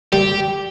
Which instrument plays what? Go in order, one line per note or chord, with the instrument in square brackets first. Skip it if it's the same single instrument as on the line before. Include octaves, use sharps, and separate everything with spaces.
[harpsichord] G3 [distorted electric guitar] G4